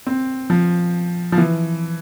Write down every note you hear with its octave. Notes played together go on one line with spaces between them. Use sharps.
C4
F3
F3
E3